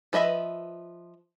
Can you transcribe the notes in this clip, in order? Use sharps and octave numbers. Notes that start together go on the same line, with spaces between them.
F3 B4 D#5 E5 B5